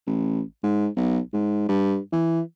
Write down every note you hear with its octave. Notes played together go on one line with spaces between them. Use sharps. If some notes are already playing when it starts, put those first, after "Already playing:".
A1
G#2
B1
G#2
G2
E3